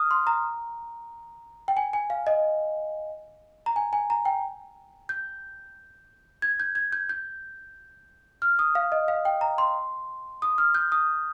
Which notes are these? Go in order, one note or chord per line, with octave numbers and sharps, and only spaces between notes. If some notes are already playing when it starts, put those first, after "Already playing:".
Already playing: D#6 F6
C6
A#5
G5
G#5
G#5
F5
D#5
A#5
G#5
G#5
A#5
G5
G6
G#6
G6
G#6
G6
G6
F6
D#6
F5
D#5
F5
G5
A#5
C6
D#6
F6
G6
D#6